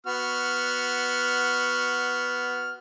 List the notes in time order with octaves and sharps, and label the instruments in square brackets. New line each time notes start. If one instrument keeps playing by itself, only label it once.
[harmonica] B3 F#4 F6